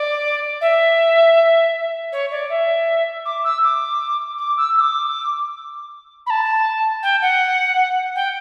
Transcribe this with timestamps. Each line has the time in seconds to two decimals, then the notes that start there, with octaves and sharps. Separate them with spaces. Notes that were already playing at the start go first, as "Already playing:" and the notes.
Already playing: D5
0.61 E5
2.12 C#5
2.31 D5
2.49 E5
3.25 D6
3.44 E6
3.63 D6
4.38 D6
4.57 E6
4.75 E6
4.80 D6
6.26 B5
6.30 A5
7.03 G5
7.21 F#5
8.15 G5